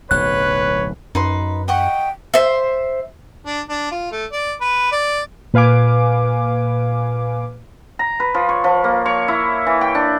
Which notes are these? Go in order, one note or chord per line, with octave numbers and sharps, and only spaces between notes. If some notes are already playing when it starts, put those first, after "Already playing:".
D1 B1 B4 C#5 F#6
F#2 D#4 B4 C6
D#5 F#5 G5 C#6
C5 E5
D4
D4
F4
A3
D5
B4
D5
A#2 B4 F5 G#5 D6
A#5
B4
F3
C#5
F3
A#3
C#5
E4
E3
G5
D4